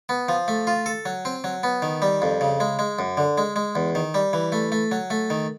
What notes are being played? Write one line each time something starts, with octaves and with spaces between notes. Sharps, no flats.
B3
F3
A3
F4
A4
F#3
C4
F#3
B3
D#3
G3
F2
C#3
G#3
G#3
F#2
D3
G#3
G#3
E2
D#3
G3
E3
A3
A3
F#3
A3
D#3